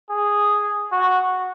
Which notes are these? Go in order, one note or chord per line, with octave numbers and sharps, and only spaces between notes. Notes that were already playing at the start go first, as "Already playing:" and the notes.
G#4
F#4